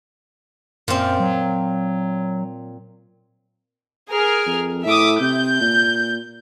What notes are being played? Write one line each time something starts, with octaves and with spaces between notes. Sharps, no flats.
F#2 A#2 C4
F#3
G#4 A#4 F6
F2
A2 E5 D6 D#6
C3 G6
A#2